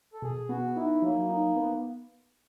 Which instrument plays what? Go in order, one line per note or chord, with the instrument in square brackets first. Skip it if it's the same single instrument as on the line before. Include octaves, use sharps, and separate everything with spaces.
[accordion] A4
[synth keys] B2 [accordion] G#4
[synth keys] B3 [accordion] F#4
[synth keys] D#4 [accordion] E4
[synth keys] F#3 [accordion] A#3
[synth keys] D#4
B3